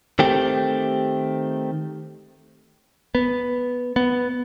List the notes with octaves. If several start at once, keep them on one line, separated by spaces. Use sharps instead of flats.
D#3 A3 C4 G4
B3
B3